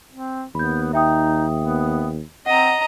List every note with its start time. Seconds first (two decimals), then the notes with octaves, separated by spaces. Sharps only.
0.12 C4
0.55 D#2 B3 B5 G6
0.93 D#4 E5 G5 D#6
1.59 B3
2.46 C4 D#5 F#5 A#5